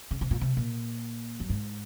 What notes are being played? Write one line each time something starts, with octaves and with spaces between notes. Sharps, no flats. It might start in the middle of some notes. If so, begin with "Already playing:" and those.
C#3
C3
A#2
C3
A#2
F#2
G#2